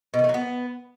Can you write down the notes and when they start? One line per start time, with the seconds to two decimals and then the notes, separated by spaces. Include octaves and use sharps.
0.14 B2
0.19 D#3
0.24 A3
0.29 F#3
0.34 B3